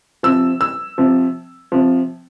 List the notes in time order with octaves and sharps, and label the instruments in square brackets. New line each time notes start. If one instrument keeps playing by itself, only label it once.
[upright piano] C3 F3 E6
E6
C3 F3
C3 F3